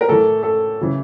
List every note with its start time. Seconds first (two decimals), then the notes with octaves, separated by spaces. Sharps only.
0.01 A#4
0.08 A2 E3 A4
0.43 A4
0.81 C#3 E3